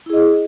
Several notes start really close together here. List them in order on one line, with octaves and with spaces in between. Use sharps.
E4 G#4 D#5